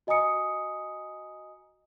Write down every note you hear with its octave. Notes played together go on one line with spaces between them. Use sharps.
F#4 D#5 G#5 A#5 D#6 C#7